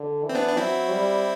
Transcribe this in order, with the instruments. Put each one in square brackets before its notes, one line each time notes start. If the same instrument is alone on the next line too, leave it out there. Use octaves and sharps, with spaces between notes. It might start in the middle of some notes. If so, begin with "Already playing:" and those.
Already playing: [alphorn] D3
[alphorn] E3 [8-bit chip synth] C4
[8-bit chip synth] B3 D4
D4
[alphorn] F#3 [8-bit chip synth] C4 E4
[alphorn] G3